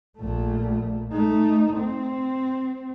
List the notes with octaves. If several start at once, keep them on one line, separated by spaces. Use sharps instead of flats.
A#1 A3
A3 D#4
C4